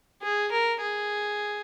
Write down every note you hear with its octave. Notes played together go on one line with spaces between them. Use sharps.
G#4
A#4
G#4